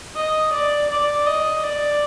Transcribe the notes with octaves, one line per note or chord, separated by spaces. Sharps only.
D#5
D5
D5
D#5
D5